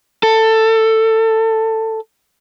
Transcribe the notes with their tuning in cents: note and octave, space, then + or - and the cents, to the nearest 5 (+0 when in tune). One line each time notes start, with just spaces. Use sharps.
A4 +15